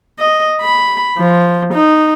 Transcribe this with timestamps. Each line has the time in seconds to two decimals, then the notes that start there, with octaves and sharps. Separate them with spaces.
0.19 D#5
0.61 B5
1.18 F3
1.73 D#4